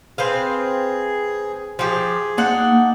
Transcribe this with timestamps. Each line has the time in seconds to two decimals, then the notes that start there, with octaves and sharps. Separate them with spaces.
0.18 C4 G#4 B4 F5
1.79 F3 G4 G#4
2.38 A#3 D4 D#4 F#5